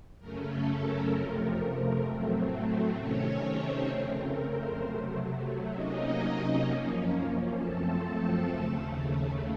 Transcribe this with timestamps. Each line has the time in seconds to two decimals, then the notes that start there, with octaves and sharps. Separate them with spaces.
0.19 F#2 C#3 A3 C#4 A#4
0.50 A4
0.81 A#4
1.12 F2 C3 F3 A3
2.04 A2 F#3 A3 C4
2.96 C3 D#3 A3 C#4 C#5
3.42 C4 C5
3.88 F2 C#3 A3 C4 A#4
4.19 A#4
4.49 C4 C5
4.80 C3 F#3 A3
5.72 C3 F#3 A#3 C#4 D#4 D#5
6.64 F#2 F3 A#3 C#4
7.56 F#2 F3 A3 C4 A4 A5
8.49 D#2 C#3 A3